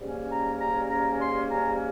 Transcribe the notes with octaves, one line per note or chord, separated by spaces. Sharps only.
G#2 G3 A#3 C#4
A#5
A#5
A#5
C6
A#5